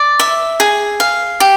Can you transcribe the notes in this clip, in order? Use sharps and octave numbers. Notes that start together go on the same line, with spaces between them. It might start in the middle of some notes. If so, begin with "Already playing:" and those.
Already playing: D5
E5
G#4
F5
G4